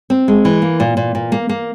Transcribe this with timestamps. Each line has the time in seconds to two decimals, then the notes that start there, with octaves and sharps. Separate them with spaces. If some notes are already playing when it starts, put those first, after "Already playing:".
0.10 C4
0.28 G#3
0.45 E3
0.62 A#3
0.80 A#2
0.97 A#2
1.15 A#2
1.32 A#3
1.49 A#3